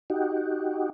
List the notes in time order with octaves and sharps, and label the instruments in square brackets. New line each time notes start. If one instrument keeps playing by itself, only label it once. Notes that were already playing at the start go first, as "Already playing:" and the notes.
[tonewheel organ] D#4 F#4 G4